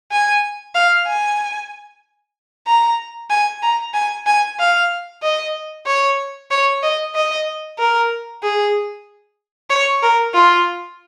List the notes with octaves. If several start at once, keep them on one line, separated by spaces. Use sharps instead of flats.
G#5
F5
G#5
A#5
G#5
A#5
G#5
G#5
F5
D#5
C#5
C#5
D#5
D#5
A#4
G#4
C#5
A#4
F4